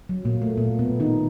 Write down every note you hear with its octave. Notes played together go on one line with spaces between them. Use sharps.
F#3
A#2 A#3
A3
A#2 A#3
B2 B3
D#3 D#4